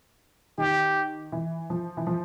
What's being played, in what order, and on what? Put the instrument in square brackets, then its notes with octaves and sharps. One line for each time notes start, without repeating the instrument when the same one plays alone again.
[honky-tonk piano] D#3 [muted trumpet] G4
[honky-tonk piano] E3
F3
E3
F3